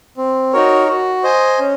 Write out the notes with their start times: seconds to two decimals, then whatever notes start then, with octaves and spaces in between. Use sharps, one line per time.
0.17 C4
0.53 D#4 F#4 A#4 C#5
0.88 F#4
1.24 C5 D#5 G#5
1.59 C#4